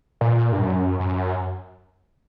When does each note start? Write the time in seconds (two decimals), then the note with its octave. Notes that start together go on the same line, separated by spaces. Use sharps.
0.21 A#2
0.52 G2
0.61 F#2
1.00 F#2